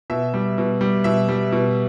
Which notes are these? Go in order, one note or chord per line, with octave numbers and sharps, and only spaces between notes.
B2 E5
G3
B2
G3
B2 E5
G3
B2